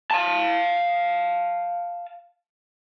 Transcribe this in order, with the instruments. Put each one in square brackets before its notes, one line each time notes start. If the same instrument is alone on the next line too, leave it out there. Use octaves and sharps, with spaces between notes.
[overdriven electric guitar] F5 A5